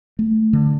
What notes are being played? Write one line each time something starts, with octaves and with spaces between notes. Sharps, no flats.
A3
D3